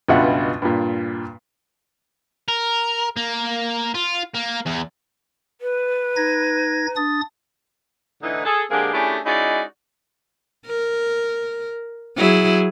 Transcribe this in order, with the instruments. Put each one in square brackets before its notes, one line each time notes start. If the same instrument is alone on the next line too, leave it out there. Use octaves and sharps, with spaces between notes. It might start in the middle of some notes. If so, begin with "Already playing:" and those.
[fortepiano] C#2 G2 B2 F4 E5 F#5
G2 A#2
[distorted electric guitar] A#4
A#3
F4
A#3
E2
[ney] B4
[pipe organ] D#4 G#6 A#6
D4 D#6 A6
[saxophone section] A2 D3 E3 D#4
G#4 A4
D3 G#3 A#3 C4 G4 G#4
A3 C#4 D4 E4 G4 G#4
G#3 C#4 D#4 E4 F#4 D5
[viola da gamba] A#4
F#3 E4 G#4